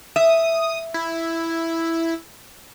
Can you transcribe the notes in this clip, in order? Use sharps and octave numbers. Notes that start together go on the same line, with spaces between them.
E5 D#6
E4